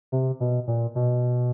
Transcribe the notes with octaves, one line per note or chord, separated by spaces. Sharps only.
C3
B2
A#2
B2